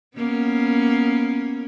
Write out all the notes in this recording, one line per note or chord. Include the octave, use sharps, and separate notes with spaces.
A#3 B3 C#4